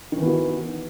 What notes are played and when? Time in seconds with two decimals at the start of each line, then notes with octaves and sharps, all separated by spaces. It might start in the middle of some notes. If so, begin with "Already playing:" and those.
0.12 D#3
0.17 E3
0.22 B3
0.27 F#4